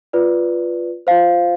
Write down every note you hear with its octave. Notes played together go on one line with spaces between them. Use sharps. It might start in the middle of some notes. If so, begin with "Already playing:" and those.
F4 B4 D5
F4 C5 F5